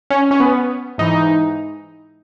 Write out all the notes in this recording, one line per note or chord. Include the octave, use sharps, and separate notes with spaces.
C#4
C#4
B3
G#2 E3 D#4